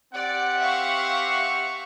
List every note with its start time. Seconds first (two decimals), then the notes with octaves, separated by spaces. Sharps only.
0.14 C4 G4 D5 F#5
0.60 E5 F5 C#6